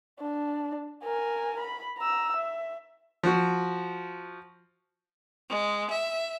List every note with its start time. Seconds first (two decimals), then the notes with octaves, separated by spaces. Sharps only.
0.20 D4
1.03 A#4 G#5
1.59 B5
1.98 A#5 E6
2.37 E5
3.23 F3 F#4
5.49 G#3
5.90 E5